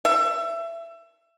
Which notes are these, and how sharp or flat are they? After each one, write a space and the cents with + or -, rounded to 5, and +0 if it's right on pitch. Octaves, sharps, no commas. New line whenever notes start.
E5 +25